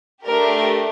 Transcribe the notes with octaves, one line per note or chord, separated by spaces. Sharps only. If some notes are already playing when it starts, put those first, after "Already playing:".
A3 D4 G4 A#4